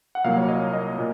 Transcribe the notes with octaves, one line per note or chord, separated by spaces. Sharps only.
F#5
C2 A#2 F#3 A#3 F5
C#5
D#5
D#5
A#2